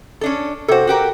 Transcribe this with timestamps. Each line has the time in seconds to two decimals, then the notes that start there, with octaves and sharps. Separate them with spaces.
0.21 C#4 D4 A4
0.68 C3 F#4 A4 C5
0.87 F#4 G4 A#4